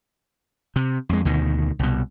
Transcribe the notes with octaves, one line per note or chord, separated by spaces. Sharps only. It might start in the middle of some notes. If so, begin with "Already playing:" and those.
C3
F2 G#3
D2 B2 D#3
C2 B2